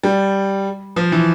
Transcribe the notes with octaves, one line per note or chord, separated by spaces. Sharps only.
G3
F3
E3